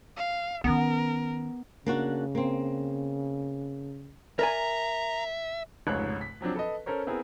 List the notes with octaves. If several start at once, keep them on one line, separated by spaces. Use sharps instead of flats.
F5
D#3 B3 C#4 A#4
C#3 A#3 D4 F#4
A#3 C4
A#4 D5 E5 G#5 A#5
F1 C#2 G#2 C#5 F#6
B6
F3 F#3 C4 D4
A4 B4 D#5
C#4 A4 A#4 C5 C#5
B3 C4 E4 G#4 A#4